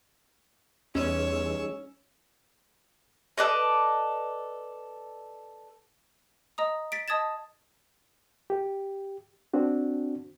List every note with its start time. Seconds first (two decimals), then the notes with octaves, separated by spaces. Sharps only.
0.95 E2 G3 C#4 D#4 G#4 C#5 E6
3.38 A4 B4 D5 D#5
6.58 D#5 A#5 D#6
6.92 A6 B6 D7
7.08 D#5 A5 D#6 G#6 A6 E7
8.50 G4
9.54 C4 D4 F#4